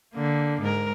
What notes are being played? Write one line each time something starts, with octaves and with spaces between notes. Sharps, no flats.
D3 A#3
G#2 A#4